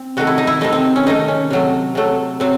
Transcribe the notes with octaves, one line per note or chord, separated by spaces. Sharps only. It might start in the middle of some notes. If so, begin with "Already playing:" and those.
Already playing: C4
C3 D#3 A3 F#4
E4
D#4
E4
C3 D#3 A3 D#4
C4
C#4
C3 D#3 A3 D#4
C#4
C3 F#3 A3
C3 F#3 A3
C3 F#3 C4